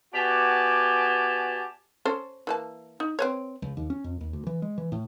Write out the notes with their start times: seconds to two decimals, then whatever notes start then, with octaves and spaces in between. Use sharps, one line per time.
0.14 B3 F#4 G4 D5 G#5 A5
2.05 C#4 A4 C5
2.47 E3 A#3 A5
3.00 D#4
3.19 C4 B4 C#5
3.62 C#2
3.77 D#2
3.90 C#4
4.04 F2
4.21 D#2
4.33 D2
4.47 E3
4.62 G#3
4.78 E3
4.92 A2